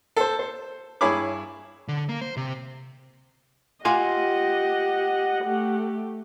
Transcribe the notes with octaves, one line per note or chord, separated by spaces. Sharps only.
A4 C5
C5
G2 E4 G#4 C#5 B5 D6
D3
A#3
C5
C3
F4 G4 D#5 F5 F#5 G#5
A3 G4